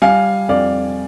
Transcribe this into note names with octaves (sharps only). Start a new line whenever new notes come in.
G3 F5 G#5
F2 D5 F5